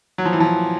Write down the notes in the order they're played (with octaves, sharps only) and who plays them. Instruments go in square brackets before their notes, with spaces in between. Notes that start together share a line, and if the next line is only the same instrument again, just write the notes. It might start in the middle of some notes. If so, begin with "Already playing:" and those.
[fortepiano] F#3
F3
E3
F3